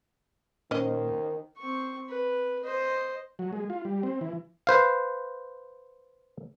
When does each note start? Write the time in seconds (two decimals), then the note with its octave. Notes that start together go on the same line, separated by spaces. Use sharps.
0.71 A#2 D#3 C#4 C5 D#5
1.58 C4 C#6
2.09 B4
2.64 C5 D#5
3.39 F#3
3.53 G#3
3.70 F4
3.85 G3
4.03 C4
4.21 E3
4.67 B4 C5 F5